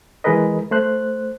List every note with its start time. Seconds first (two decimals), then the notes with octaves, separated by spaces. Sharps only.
0.24 E3 G#3 G#4 A#4 B4 D#5
0.71 A3 C5 F#6